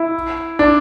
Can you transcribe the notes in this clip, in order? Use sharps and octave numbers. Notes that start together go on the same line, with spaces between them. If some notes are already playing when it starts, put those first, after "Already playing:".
Already playing: E4
D4